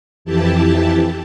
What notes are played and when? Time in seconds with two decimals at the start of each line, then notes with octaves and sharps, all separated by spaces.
0.25 F2 E3 E4 G4 A5